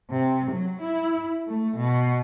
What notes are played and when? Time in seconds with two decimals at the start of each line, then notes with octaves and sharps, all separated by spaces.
0.10 C3
0.51 F#3
0.81 E4
1.47 A3
1.77 B2